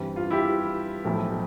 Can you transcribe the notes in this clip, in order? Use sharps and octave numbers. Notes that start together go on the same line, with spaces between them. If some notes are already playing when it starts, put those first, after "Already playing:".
Already playing: G2 E3 G3 C4
F4
E4 G4
B1 A2 F3 A3